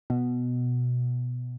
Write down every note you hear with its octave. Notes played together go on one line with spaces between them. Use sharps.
B2